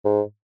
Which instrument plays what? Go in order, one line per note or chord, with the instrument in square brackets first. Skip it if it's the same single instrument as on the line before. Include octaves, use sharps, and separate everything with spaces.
[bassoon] G#2